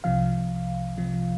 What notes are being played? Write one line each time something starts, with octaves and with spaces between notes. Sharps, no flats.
C2 C3 F3 F5
C2 C3 F3